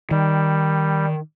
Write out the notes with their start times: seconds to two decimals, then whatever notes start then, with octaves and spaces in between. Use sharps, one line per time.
0.11 D#3 G3